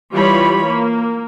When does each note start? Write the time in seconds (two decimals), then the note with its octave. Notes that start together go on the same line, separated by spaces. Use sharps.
0.13 E3 G3 F4 C#5 B5
0.66 A#3